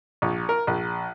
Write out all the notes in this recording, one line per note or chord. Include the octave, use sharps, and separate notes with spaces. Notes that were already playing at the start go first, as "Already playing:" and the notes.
A#1
A#4
A#1